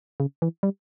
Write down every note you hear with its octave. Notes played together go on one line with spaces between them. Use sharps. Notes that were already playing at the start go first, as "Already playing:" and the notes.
C#3
E3
G3